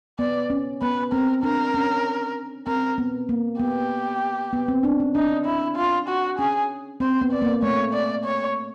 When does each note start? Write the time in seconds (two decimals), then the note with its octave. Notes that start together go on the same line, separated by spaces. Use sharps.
0.19 B3 D5
0.50 C#4
0.82 B3 B4
1.12 C4 A#4
1.43 D4 A#4
1.74 C#4
2.67 C4 A#4
2.98 B3
3.29 A#3
3.60 B3 G4
4.53 B3
4.68 C4
4.83 D4
5.00 C#4
5.15 D4 D#4
5.46 E4
5.76 F4
6.08 F#4
6.38 C#4 G#4
7.00 C4 C5
7.21 B3
7.32 D5
7.42 A#3
7.62 A3 C#5
7.93 D5
8.24 C#5